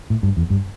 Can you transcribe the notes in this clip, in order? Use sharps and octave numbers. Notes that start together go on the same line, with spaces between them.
A2
G2
E2
G2